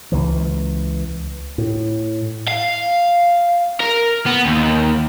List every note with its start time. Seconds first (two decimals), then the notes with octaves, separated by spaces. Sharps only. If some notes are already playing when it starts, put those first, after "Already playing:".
0.12 C#2 E3
1.58 A2
2.48 F5
3.80 A#4
4.26 B3
4.46 D#2